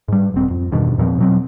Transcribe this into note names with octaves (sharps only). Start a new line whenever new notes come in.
G#2 G3
E1 C4
F2
E2 G2 B2 D#3
E2 A#2 F3 C4
B2 F#3 C4